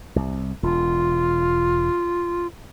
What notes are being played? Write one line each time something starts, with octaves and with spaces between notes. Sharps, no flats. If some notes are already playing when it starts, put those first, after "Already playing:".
C2
E1 F4